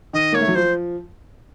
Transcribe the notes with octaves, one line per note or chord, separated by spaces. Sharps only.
D#3 D#5
A#3 C#5
A3
F#3
F3 C5